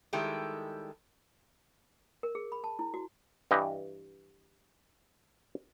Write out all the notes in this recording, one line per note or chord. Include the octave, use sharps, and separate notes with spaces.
D#3 G3 G#3 E4 G4 A4
A#4
G#4
B5
A5
E4
F#4
G2 E3 G4 D#5